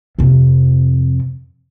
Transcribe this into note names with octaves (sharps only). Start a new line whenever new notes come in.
F2 C3